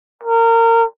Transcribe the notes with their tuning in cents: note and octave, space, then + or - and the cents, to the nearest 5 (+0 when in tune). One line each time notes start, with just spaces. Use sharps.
A#4 -25